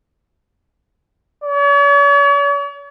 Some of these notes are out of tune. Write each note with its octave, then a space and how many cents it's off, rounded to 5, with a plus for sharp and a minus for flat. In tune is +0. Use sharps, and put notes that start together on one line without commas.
C#5 +45